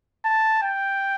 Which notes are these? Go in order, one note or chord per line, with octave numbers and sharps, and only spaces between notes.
A5
G5